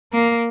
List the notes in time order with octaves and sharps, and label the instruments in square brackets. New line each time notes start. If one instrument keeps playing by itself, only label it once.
[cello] A#3